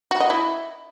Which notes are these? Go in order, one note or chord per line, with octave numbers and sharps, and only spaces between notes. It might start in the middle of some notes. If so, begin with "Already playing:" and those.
F#4
D#5
E4